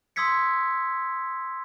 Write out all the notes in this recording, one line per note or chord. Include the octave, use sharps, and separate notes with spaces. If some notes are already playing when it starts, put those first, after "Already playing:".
C6 D#6 E6 G#6 B6 C#7